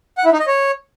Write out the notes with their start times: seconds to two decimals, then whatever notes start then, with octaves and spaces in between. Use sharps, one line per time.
0.18 F#5
0.25 E4
0.32 D#4
0.40 D#5
0.47 C#5